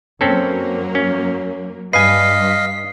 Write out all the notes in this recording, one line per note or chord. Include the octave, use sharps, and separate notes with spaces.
F#2 F#3 A#3 C4 C#4 A4
C#4
G2 B4 D#5 F5 G#5 B6 C7